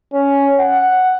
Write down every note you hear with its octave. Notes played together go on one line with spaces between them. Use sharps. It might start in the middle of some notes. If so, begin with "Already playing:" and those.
C#4
F#5